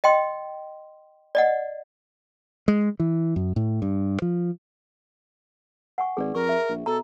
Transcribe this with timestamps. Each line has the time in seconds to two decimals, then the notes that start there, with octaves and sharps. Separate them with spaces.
0.04 D#5 G5 C6
1.35 D5 D#5 F#5
2.68 G#3
3.00 E3
3.36 F#2
3.56 A2
3.82 G2
4.22 F3
5.98 F#5 G#5 C#6
6.17 G#1 G#4 B4 D5
6.35 F2 A#4 C#6
6.49 E5
6.69 A#1
6.86 B2 A4 A#5